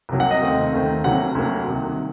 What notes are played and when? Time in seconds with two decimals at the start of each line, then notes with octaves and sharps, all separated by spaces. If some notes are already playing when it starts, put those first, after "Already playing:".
0.09 C2 C3 F#3 A#3
0.20 F#5
0.31 D#5
0.41 D#2 D#3 A3 C4
0.73 D#2 D#3 A3 C4
1.04 D2 C3 F#3 A#3 F#5
1.35 D2 C3 F#3 A#3
1.67 C2 C3 D#3